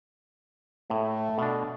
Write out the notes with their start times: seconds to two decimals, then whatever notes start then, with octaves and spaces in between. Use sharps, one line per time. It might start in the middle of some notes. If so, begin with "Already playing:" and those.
0.90 A2 A3
1.38 B2 D4